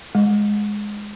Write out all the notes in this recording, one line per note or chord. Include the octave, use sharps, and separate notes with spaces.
G#3